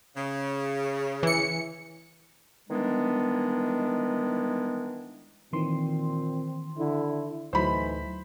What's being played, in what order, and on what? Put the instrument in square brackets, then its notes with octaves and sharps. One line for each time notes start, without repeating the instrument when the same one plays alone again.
[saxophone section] C#3
[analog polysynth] E3 C#7
[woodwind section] D#3 E3 G3 G#3 B3 D4
[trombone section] A#2 C4 [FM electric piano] D#3 E3 C6
[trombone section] D3 E4
[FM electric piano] D2 F#3 [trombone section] A2 E3 D#4 [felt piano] C5 B5